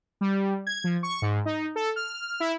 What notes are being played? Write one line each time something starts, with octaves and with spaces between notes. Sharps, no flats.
G3
G#6
F3
C#6
G#2
D#4
A4
F6
E4